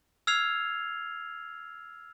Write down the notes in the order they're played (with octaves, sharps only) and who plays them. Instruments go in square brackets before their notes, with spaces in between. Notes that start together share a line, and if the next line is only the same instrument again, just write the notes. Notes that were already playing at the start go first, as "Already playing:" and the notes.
[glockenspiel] E6 F6 G#6 C7 F7